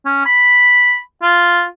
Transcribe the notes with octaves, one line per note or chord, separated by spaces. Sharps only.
C#4
B5
F4